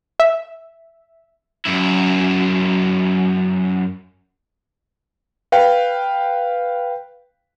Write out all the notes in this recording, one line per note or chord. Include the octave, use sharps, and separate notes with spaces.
E5
F#2 E4
B4 F5 G5